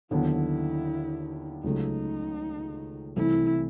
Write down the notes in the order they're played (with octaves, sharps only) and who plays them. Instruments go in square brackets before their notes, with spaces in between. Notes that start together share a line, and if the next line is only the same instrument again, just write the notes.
[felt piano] D#2 D3 F#3 B3 [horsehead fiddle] E4
[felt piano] C#2 C#3 F#3 A3 [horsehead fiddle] D#4
[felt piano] C2 C3 E3 A3 [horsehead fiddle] E4